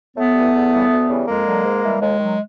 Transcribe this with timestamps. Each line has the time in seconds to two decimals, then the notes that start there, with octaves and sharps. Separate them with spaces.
0.16 A2 A3 B3
0.34 E3 G3
0.54 E2
0.71 C#3 E3 G3
0.90 D2
1.08 C#3 E3 G3
1.27 F2 G#3 A#3
1.45 D3 F#3
1.64 G#2
1.83 E3 G3
2.01 D#2 G#3
2.19 D#3 F#3